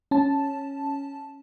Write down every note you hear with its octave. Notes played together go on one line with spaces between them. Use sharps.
C#4 A5